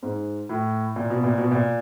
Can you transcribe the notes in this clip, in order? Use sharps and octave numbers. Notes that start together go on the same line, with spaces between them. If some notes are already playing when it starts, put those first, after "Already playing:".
G#2
A2
A#2
B2
A#2
B2
A#2